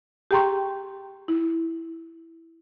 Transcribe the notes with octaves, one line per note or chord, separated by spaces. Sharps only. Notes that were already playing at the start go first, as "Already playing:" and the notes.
G4 G#4 G5 A#5 C6 C#6
E4